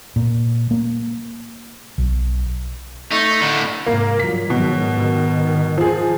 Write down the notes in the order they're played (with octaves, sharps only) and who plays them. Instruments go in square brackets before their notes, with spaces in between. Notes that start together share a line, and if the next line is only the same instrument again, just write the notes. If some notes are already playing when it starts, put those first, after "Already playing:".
[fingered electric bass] A#2
A#3
B1
[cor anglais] A3 [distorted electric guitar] D#4
[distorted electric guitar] A2 D3
[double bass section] G#2 C3 [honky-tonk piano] A#3
[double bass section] G2 F3 F#3 [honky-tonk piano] B6
[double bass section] G#2 D#3 F#3 [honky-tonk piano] B2
[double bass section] G#2 D#3
[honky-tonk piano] F3 G#4